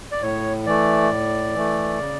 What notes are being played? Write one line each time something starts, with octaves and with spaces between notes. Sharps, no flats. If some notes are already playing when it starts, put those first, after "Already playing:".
D5
A2 C#5
E3 A3 D5
A2
E3 A3
C#3